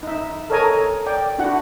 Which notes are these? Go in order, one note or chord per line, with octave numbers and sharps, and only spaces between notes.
D#4 E5
A4 A#4 C#5 D#5 G#5 A#5
D5 G5
D4 E4 F#4 F#5